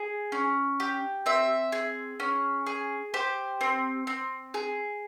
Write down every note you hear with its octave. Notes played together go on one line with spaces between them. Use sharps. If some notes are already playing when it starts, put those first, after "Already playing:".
Already playing: G#4
C#4
G4
C4 E5
G#4
C#4
G#4
G4 C5
C4
C4
G#4